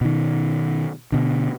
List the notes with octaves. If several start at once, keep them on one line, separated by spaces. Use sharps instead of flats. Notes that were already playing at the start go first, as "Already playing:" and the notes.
B2 D#3
B2 D3